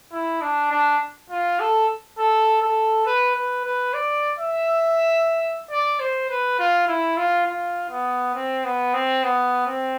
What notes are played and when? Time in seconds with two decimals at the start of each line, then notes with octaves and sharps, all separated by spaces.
0.12 E4
0.41 D4
0.71 D4
1.30 F4
1.60 A4
2.18 A4
2.62 A4
3.06 B4
3.36 B4
3.65 B4
3.94 D5
4.39 E5
5.71 D5
5.99 C5
6.30 B4
6.59 F4
6.88 E4
7.17 F4
7.47 F4
7.90 B3
8.35 C4
8.65 B3
8.94 C4
9.23 B3
9.67 C4